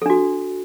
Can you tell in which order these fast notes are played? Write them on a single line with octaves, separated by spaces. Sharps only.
A4 D4 F#4